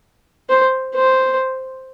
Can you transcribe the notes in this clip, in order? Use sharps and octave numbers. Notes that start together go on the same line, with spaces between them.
C5
C5